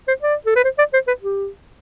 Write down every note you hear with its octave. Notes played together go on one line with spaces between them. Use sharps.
C5
D5
A4
B4
C5
D5
C5
B4
G4